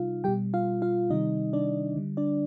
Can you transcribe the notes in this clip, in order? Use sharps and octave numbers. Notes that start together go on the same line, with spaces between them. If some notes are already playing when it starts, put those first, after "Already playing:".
Already playing: C3 G3 D#4 F4 F5
B2 G3 G4 G5
F4 F5
F4 F5
C3 D#3 G3 D#4 D#5
D4 D5
D3 G3
D4 D5